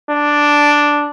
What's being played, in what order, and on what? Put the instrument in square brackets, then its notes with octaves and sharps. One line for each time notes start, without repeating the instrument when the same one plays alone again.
[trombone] D4